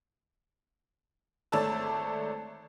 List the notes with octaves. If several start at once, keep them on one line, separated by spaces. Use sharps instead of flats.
G#1 A3 C#5 D5 A5 E6